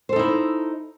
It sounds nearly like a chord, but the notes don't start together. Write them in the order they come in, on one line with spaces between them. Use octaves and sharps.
C5 A4 D#4 E4